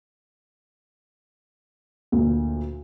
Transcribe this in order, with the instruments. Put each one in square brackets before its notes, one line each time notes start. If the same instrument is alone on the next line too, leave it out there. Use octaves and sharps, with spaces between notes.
[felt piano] D2 A#2